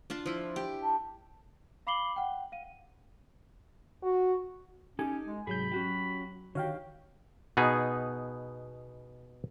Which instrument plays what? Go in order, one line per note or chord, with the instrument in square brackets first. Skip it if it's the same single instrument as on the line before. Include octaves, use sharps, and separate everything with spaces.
[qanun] D4 F4 A5
F3 E4
G4
[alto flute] A5
[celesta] F5 B5 D6 C7 F#7 G7
F#5 G5
F5 D#7
[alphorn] F#4
[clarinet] C#4 [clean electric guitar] D#4 G4 A4 [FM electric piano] G#5
[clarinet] G#3
[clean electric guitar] C2 G#4 [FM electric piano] G#2 F#3 G6 [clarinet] B5
[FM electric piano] F#3 [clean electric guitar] C#4 F#4 G4
[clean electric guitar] D3 D#3 G4 [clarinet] F#4 [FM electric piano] C#5 F5 G5
[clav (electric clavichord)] B2 B3 D#4 G#4